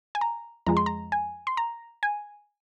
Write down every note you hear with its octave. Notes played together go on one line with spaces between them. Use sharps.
G#5
A#5
F2 F3 G#3 A#5
C6
A#5
G#5
C6
A#5
G#5